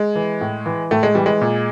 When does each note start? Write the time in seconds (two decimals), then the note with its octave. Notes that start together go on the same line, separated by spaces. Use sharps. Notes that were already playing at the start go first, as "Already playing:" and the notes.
Already playing: G#3
0.15 E3
0.41 A2
0.66 E3
0.91 A2 A3
1.03 G#3
1.15 E3 G3
1.26 G#3
1.41 A#2